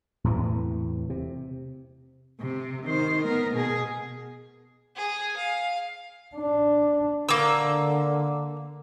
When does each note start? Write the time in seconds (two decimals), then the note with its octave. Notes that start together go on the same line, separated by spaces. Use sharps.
0.24 E2 A2 C3 E3
1.10 C3
2.41 C3
2.85 D#3 C5
3.25 B3 A#4
3.55 B2 G#4
4.96 G#4
5.37 F5
6.35 D4
7.29 D3 A#3 E6